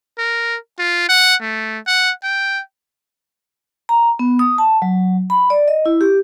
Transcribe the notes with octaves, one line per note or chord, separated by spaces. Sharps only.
A#4
F4
F#5
A3
F#5
G5
A#5
B3
D#6
A5
F#3
B5
D5
D#5
E4
G4